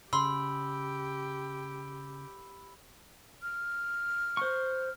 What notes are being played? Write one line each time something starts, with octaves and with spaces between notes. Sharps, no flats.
C#3 G4 B5 C6 E6
F6
C5 C#6